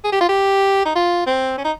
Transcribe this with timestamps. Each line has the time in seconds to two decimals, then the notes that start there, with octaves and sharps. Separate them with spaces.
0.04 G#4
0.12 G4
0.21 F4
0.29 G4
0.85 D#4
0.95 F4
1.27 C4
1.58 C#4
1.64 D#4